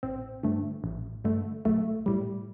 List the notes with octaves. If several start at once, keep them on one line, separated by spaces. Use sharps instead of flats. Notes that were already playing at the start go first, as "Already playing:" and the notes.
A1 C4
G2 D3 A3
A1
G2 D3 A3
B1 A3
A2 G3